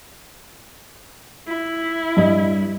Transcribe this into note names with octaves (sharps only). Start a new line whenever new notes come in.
E4
G2 D#5